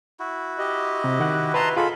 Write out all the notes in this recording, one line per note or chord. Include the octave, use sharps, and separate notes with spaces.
E4 F#4
G4 D#5
C3
D#3 F#5 F#6
B4 D#5 A5 A#5 C6
F4 G#4 A4 B5